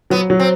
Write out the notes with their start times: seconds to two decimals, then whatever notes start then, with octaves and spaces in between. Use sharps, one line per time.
0.10 F#3 B3
0.30 F#3
0.40 C4